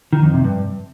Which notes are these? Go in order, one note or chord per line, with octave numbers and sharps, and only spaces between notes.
D#3
F2
C3
G2